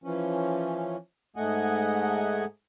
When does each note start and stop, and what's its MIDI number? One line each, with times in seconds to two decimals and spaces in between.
0.04 0.96 52
0.04 0.96 53
0.04 0.96 61
1.36 2.45 44
1.36 2.45 57
1.36 2.45 75
1.36 2.45 78
1.36 2.45 80